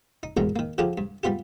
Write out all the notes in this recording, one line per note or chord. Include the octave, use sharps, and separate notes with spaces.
D#4
A1 E2 G#2 B2 D#3 A#5
D#3 A#3
D3 F3 D4 F4 G4 G#4
G2
G3 B3 F4 G4